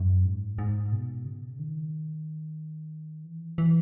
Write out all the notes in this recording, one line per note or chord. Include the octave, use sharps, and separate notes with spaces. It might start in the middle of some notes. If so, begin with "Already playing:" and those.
Already playing: F#2
G#2
G#2
B2
C#3
D#3
E3
E3